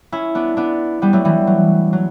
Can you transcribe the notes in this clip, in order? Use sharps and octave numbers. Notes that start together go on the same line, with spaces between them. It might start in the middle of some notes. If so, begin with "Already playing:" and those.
C#4 E4
B3 D4
B3 D4
G3 B3
F#3 A3
E3 G3
F#3
F#3